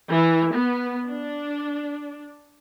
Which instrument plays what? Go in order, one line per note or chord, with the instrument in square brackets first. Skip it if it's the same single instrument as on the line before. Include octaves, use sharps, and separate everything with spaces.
[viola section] E3
B3
D4